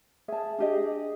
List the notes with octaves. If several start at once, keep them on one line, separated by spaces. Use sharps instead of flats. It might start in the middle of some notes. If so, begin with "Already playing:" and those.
G#4 E5 A5
D4 G4 D#5